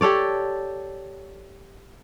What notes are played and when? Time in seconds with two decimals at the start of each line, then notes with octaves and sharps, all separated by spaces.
0.01 G4 A4 C#5 D5